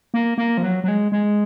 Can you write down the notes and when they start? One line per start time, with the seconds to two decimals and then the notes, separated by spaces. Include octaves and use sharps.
0.14 A#3
0.38 A#3
0.58 F3
0.63 F#3
0.84 F#3
0.88 G#3
1.12 G#3